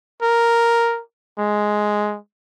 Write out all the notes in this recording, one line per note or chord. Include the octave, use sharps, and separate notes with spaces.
A#4
G#3